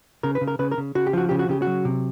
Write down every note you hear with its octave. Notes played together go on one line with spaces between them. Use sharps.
C#3 A#4
B4
C#3
A#4
C#3 B4
A#4
C#3
C#3 F#4
G4
F3 F#4
C#3 G4
F#4
C#3 G4
F#3 F#4
C3